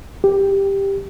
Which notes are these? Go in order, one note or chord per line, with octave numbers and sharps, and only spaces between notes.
G4